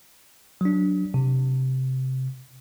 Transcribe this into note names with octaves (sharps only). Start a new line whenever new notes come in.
F#3 D4
C3